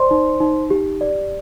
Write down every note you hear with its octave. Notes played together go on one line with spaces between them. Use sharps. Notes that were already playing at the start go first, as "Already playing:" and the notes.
Already playing: C5 D5 C6
D#4
D#4
G4
D5